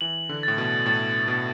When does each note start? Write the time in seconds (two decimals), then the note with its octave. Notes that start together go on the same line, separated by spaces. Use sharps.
0.01 E3 F#7
0.29 D3
0.43 A2 A6
0.58 B2
0.86 A2 A6
1.28 B2 A6